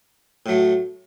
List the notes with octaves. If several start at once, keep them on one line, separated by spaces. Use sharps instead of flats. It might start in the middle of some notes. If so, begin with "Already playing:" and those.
A2 F#3 A3